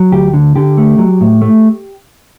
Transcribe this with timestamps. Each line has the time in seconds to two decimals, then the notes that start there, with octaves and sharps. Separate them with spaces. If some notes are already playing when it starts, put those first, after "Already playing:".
Already playing: F#3
0.12 D2 G4
0.34 D3
0.56 D3 G4
0.78 A3
0.99 F#3
1.21 A2
1.42 A3